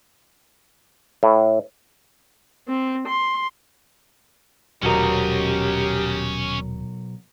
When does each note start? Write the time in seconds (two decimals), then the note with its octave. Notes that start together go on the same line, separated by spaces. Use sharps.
1.23 A2
2.68 C4
3.08 C6
4.83 D#1 B1 C#4 F#4 G4 A#4 D#5